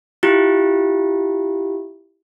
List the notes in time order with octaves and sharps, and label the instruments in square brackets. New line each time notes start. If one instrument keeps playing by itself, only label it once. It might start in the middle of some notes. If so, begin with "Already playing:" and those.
[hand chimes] E4 F4 G4